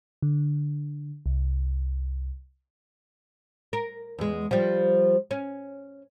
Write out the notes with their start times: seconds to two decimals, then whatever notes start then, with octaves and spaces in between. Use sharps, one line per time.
0.22 D3
1.26 C2
3.73 A#4
4.19 E2 G#3
4.51 F3 G3
5.31 C#4